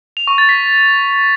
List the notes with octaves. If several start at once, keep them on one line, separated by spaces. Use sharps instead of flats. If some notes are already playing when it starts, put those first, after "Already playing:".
F7
C#6
A6
B6